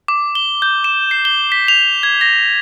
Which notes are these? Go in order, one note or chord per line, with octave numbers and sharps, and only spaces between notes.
D6
G7
G6
E7
C7
G7
B6
F7
G#6
A#6